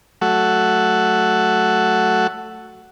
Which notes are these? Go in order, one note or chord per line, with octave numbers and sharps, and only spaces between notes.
F#3 A3 F#4 A4 F#5